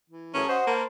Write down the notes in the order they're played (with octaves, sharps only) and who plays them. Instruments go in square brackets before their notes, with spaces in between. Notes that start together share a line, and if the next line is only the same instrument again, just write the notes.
[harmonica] E3
[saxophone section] A2 E3 F#3 [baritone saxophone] C#4 [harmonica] G#4 A#4 A5
[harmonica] F#4 D#5 [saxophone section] C5 [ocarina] F#5
[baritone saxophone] A#3 [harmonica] A#4 B4 A5